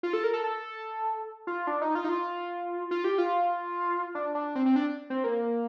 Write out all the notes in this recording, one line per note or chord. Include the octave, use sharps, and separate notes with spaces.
F4
A4
A#4
A4
A4
F4
D4
D#4
F4
D#4
F4
F4
G4
F4
D4
D4
C4
C4
D4
C4
A#3